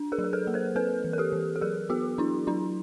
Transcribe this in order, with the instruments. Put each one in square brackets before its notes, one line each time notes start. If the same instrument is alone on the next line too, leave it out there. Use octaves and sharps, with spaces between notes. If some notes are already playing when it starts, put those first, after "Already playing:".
Already playing: [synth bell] D4
G#4 A#4
F#3
A#4
A4 B4
A#3
A#4 C5
C4 A4 B4
E3
A#4
G4 A4
E3
A4
F#3 G#4 A#4
B3 F#4 G#4
F#3 D4 E4
F#3 D4 E4